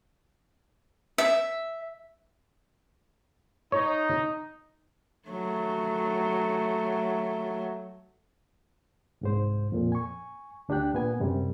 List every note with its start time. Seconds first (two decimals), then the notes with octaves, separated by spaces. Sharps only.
1.18 E5
3.72 D#4 C#5
5.29 F#3 A3
9.21 C2 G#2 C5
9.72 F2 A#2
9.92 G#5 C#6
10.69 D2 D4 G4 G5 F#6
10.93 A#2 B3 G#5
11.20 F#2 C3 G3